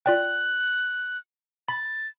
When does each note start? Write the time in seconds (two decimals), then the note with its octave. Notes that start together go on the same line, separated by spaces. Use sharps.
0.06 F4 D5 G5 F#6
1.68 B5 A6